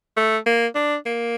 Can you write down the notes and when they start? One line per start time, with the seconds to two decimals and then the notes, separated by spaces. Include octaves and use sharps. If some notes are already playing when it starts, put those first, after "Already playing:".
0.17 A3
0.46 A#3
0.75 D4
1.06 A#3